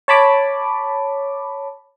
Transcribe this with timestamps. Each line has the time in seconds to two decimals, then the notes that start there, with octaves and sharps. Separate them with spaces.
0.08 C#5 A5 B5 D6